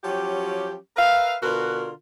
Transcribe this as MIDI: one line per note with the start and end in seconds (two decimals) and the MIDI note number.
0.04 0.76 53
0.04 0.76 54
0.04 0.76 61
0.04 0.76 67
0.96 1.35 70
0.96 1.35 71
0.96 1.35 76
0.96 1.35 77
1.43 1.90 47
1.43 1.90 50
1.43 1.90 65
1.43 1.90 66
1.43 1.90 70
1.43 1.90 71